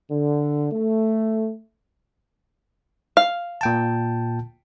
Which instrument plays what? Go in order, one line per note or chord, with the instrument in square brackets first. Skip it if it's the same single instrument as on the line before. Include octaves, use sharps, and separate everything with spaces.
[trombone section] D3
A3
[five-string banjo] F5
[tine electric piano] A#2 G5 A5